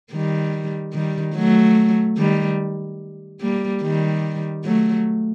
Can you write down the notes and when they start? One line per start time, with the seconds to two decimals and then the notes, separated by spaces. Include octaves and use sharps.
0.12 D#3 G3
0.94 D#3 G3
1.35 F#3 A3
2.17 D#3 G3
3.41 G3 A#3
3.83 D#3 G3
4.65 F#3 A3